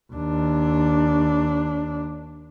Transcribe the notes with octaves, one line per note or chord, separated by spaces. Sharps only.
D#2 D4